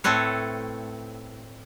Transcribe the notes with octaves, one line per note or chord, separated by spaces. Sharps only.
A2 A3 C4 A4 B4 C#5